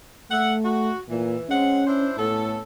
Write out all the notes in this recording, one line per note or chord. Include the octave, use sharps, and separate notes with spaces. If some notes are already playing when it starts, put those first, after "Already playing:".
A3 E5 F#5
F#4
A#2 E3
G#3 C4 C#4 F#5
D4 E4 C5
A2 B3 C#4 A4